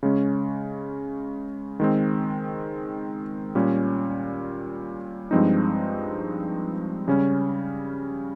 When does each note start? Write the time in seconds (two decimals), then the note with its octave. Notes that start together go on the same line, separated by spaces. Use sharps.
0.03 C#3 G#3 C#4
1.80 D#3 G#3 C4
3.55 A#2 G3 C#4
5.31 G2 F3 G#3 C4 D#4
7.08 C#3 G3 C#4